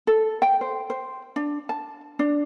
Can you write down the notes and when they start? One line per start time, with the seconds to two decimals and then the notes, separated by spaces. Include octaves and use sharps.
0.07 A4
0.42 G5
0.61 C5
0.90 C5
1.36 D4
1.69 A5
2.19 D4